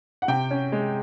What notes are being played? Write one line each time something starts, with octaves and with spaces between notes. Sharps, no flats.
F#5
C3 G5
C#4
G#3